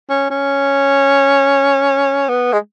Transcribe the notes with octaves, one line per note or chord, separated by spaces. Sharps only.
C#4
C#4
B3
G#3